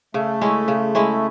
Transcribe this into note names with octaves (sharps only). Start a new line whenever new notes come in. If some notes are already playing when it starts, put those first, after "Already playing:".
C#3 A3
G#3 C#4 E4
C#3
G#3 C#4 E4